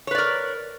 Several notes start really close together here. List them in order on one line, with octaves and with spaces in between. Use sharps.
C#5 B4 D5 A#4